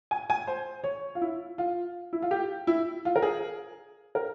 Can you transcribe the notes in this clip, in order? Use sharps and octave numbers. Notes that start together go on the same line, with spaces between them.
G#5
G#5
C5
C#5
F4
E4
F4
E4
F4
G4
E4
F4
A#4
G#4
A#4